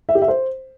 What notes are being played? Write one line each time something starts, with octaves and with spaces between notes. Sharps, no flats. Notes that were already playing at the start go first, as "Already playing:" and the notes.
E5
G4
E5
C5